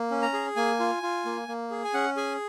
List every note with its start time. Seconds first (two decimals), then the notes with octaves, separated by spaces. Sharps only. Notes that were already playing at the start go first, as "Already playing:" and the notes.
Already playing: A#3
0.11 C#4
0.22 A#5
0.33 G#4
0.56 A#3 G#5
0.80 F4
1.03 F4
1.25 A#3
1.48 A#3
1.71 G#4
1.84 G#5
1.94 C#4 F#5
2.17 G#4 G#5